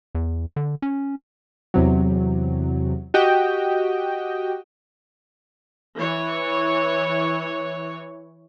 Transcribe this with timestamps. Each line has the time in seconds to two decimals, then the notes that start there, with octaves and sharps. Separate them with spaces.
0.15 E2
0.56 D3
0.82 C#4
1.74 E2 C3 F#3
3.14 F#4 G4 D#5 G5
5.97 E3 C#5